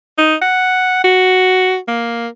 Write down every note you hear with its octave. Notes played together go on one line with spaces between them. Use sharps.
D#4
F#5
F#4
A#3